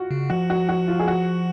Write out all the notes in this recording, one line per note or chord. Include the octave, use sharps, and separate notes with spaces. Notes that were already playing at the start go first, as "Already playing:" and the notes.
Already playing: F4 F#4
C#3
F3 F#4
F#4
F#4
F4
G#4
F#4